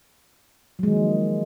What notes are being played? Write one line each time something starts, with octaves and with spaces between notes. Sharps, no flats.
D#3 F3 F#3 G#3 A#3